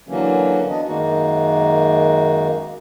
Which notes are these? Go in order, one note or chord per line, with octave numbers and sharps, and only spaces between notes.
D3 E3 F#3 A#3 C#4
B3 D4 D#5
F#2 D#3 G#3 A#3 D#4 F#4